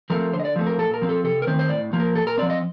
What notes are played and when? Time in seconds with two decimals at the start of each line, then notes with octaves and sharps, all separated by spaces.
0.10 F3 A3 C4 A#4
0.33 D3 C5
0.40 D#5
0.45 D5
0.56 F3 A3 C4
0.66 A#4
0.78 A#2 A4
0.94 A#4
1.02 F3 C4
1.09 A4
1.24 C3 A4
1.42 A#4
1.47 D#3 A3 C4 C5
1.59 C5
1.69 A2 D5
1.93 F3 A#3
2.00 A#4
2.15 A#2 A4
2.27 A#4
2.38 C4 D5
2.42 F3
2.50 D#5